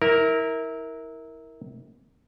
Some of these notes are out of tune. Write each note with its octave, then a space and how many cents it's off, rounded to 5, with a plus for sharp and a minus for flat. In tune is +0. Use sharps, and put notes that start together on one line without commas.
E4 -25 A#4 +0